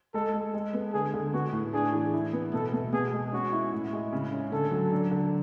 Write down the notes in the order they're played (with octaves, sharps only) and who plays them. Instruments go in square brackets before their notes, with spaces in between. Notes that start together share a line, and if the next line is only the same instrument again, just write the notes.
[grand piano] G#3 [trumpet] A4
[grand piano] G#3
G#3
B3
[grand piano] D3 [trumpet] G#4
[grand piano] D3
[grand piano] B3 [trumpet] F#4
[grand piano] A2
[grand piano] D4 [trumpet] G#4
[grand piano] E3
E4
B3
[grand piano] B2 [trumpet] A4
[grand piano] B2
[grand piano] B2 [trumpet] G#4
[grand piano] G#3
[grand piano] C#4 [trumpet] F#4
[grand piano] E4
A2
G#3
C#3
C#4
[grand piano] D3 [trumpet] A4
[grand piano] F#3
D4
D3